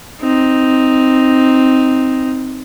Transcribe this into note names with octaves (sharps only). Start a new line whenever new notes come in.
C4 D#4